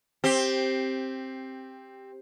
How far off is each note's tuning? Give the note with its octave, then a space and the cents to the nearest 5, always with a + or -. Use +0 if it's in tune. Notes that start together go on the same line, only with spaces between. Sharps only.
C4 +10 G4 +0